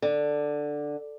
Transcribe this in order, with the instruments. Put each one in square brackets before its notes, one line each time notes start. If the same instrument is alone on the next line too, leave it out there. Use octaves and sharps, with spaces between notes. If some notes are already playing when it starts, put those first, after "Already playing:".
[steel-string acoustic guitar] D3